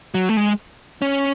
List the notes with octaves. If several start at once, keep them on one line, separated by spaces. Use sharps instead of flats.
F#3
A3
G#3
C#4